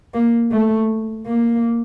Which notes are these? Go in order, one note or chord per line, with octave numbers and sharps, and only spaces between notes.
A#3
A3
A#3